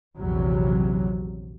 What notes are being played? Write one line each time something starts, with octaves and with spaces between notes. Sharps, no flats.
A#1 E2 C3 F#3